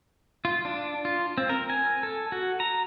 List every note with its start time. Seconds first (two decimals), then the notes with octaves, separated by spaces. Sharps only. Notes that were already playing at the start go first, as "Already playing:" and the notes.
0.45 F4
0.65 D4
1.05 F4
1.38 C4
1.49 A#4
1.70 G#5
2.03 A4
2.32 F#4
2.60 A#5